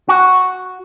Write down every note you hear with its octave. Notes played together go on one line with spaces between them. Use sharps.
F#4